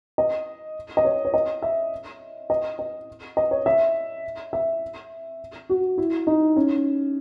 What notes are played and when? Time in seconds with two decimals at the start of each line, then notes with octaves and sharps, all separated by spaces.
0.18 D#5
0.97 D#5
1.05 C#5
1.25 C#5
1.34 D#5
1.62 E5
2.50 D#5
2.79 D#5
3.37 D#5
3.51 C#5
3.66 E5
4.53 E5
5.69 F#4
5.98 E4
6.27 D#4
6.56 C#4